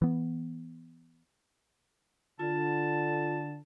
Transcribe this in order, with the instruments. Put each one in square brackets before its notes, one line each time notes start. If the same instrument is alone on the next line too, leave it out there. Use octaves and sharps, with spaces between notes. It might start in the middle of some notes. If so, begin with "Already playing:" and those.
[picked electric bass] E3 B3
[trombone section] D3 [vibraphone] F4 [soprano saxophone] A5